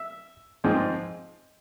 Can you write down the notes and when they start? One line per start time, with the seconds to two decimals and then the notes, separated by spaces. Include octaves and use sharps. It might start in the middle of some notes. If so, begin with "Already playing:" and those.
Already playing: E5
0.64 G#2 F3 G#3 C4